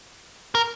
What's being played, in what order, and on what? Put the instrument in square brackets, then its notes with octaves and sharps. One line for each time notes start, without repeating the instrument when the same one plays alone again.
[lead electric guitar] A#4